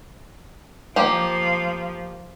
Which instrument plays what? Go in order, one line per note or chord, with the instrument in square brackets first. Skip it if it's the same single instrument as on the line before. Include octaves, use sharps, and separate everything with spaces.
[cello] F3 [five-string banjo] A#3 G4